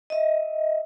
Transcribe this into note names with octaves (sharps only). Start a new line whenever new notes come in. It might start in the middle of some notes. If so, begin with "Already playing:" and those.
D#5 E5